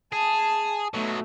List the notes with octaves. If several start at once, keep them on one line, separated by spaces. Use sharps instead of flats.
G#4 A5
B2 F#3 A3